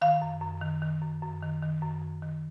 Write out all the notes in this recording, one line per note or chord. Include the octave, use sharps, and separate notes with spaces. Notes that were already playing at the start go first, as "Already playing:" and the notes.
D#3 F5
F#2
F#2
D#3
D#3
F#2
F#2
D#3
D#3
F#2
F#2
D#3